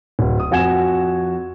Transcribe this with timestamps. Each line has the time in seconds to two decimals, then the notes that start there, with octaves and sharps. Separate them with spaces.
0.19 D1
0.40 D#6
0.51 F2 F#4 G#5 G#6 E7